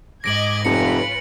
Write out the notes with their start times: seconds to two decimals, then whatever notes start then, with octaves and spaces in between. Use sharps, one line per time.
0.24 G#2 D#5 D6 G#6 A#6 D7 F#7
0.65 F1 C#4 F4 B4 C#7